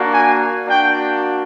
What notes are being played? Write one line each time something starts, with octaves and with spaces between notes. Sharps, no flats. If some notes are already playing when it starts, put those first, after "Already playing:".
Already playing: A#3 D4 F#4
G#5
A#3 D4 F#4 G5